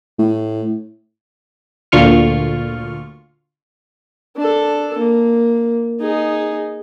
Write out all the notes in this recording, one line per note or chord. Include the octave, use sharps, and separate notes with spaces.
A2
D2 A#2 D3 F4 C#6 F6
D4 A4
A#3
D#4 G#4